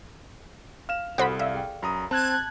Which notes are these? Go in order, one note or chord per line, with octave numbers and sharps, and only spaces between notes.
F5 F6 E7
C2 F#4 A4 C5 G#5 B5
D5 E5 F5
G#4 G5
F#2 A#5 B5 D#6
C4 A5 F#6 G#6